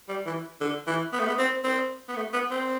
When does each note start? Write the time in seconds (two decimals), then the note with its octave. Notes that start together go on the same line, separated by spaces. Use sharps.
0.09 G3
0.26 E3
0.61 D3
0.87 E3
1.13 B3
1.19 A3
1.28 B3
1.38 C4
1.64 C4
2.08 B3
2.16 A3
2.33 B3
2.51 C4